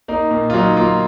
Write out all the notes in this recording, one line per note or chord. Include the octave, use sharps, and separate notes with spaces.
A#3 D#4
A#2
F4
F#3 D#4
A#3 F4